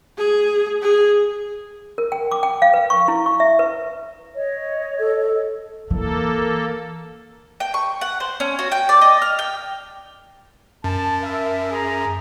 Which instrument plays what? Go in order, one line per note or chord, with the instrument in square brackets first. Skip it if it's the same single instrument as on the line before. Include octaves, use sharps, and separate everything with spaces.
[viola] G#4
G#4
[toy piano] A#4
G5
D6
G5
F5
B4
C#6
E4
C#6
E5
B4
[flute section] C#5 D#5
[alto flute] A4
[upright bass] E3 [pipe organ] A#3 A4
[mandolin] G5
C#6
F#5
C5
C#4
F#4
G5
D5
D#5
F6
G5
[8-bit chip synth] F#2 [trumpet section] A5
[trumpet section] A#4 E5
G#4 A#5